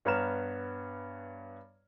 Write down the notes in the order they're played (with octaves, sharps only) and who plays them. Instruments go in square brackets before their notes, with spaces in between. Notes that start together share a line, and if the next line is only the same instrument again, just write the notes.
[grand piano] G2 B3 C#5 A#5 F6 E7